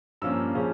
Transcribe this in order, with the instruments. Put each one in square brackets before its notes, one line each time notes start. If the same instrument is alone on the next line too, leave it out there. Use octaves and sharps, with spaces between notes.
[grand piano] G2 F3 A#3 C#4 E6
C#3 F3 C#4